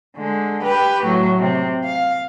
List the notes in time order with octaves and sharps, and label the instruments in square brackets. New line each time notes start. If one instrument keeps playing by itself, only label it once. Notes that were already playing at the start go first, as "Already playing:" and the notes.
[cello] D3 G#3
G4 B4
A2 F#3
C3
F5